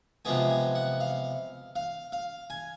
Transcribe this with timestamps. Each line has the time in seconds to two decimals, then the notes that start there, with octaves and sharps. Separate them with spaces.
0.25 C3 F3 G#3 B3 G#5
0.50 G#5
0.75 F#5
1.00 F5
1.76 F5
2.12 F5
2.50 G#5